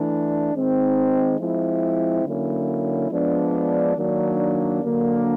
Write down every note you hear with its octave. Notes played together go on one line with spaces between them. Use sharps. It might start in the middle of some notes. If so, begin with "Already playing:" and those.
Already playing: E3 A3 D4
D#3 G#3 C4 D#4
F3 G#3 C4 E4
D3 F#3 A#3 C#4 E4
F3 G#3 B3 D4
D#3 F#3 A#3 D4
D3 F#3 A#3 D4